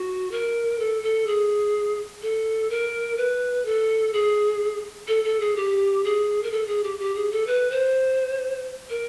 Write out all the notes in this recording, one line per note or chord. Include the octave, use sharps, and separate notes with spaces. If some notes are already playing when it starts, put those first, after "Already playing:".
Already playing: F#4
A#4
A4
A4
G#4
A4
A#4
B4
A4
G#4
A4
A4
G#4
G4
G#4
A#4
A4
G#4
G4
G4
G#4
A4
B4
C5
A#4